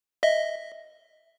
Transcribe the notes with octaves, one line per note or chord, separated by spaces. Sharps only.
D#5 E5